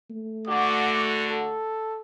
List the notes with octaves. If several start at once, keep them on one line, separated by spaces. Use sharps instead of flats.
A3
D3 F#4 D6
A4